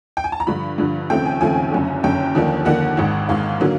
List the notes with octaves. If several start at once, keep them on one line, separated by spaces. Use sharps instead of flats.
G5
G#5
A5
A#5
G2 D3 F3 B5
G2 D3 F3
D#2 C#3 F3 A3 C4 G5
G#5
D#2 C#3 F3 A3 C4 G#5
F#1 F#2 D3
F#1 F#2 D3 G5
D#2 D3 F3 A#3 D4
D#2 D3 F3 A#3 D4 F#5
G#1 G#2 D#3
G#1 G#2 D#3 F5
D3 F#3 A#3